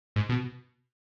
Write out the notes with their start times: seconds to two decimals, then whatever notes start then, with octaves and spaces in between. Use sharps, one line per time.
0.16 G#2
0.29 B2